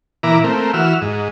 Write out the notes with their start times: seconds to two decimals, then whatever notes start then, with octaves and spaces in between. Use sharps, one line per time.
0.23 A#2 E3 E4 A#5 D6
0.44 A3 A#3 C4
0.74 E3 F#4 E6 F6
1.02 G#2